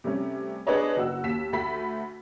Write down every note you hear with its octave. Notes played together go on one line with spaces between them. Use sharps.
C3 G3 A3 C#4
B3 D4 G#4 B4 C#5 D#5
F#1 F#4 E6
D#2 B6 E7
D2 A3 B5 B6